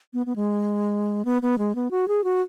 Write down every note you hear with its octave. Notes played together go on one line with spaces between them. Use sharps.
B3
B3
G#3
B3
B3
G#3
B3
F#4
G#4
F#4